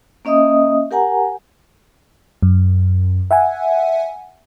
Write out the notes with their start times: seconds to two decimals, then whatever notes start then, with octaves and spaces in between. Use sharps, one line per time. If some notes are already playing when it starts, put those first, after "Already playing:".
0.25 A#3 C#4 D#5 E5 D#6
0.91 G4 A#4 F#5 G#5 A#5
2.43 F#2
3.31 E5 F#5 G#5